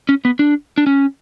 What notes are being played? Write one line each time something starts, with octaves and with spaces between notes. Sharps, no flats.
C#4
B3
D4
D4
C#4